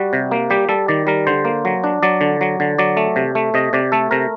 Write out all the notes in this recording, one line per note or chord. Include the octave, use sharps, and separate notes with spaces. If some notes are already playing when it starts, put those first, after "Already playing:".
Already playing: G3 F#4
C3
A#3
G3 G4
G3 A4
D#3 D5
G3 A#4
D3 C5
A#3
F#3
D4
F#3 D5
D3
F#3
D3
F#3 D5
A3
C3
A3
C3 D#5
C3 D5
A3 A4
C3 A#4